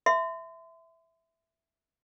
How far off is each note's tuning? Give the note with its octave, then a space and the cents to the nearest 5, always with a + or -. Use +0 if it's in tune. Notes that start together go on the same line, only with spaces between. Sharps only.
E5 +0 C6 -35